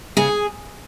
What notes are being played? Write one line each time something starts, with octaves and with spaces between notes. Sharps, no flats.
C#3 G#4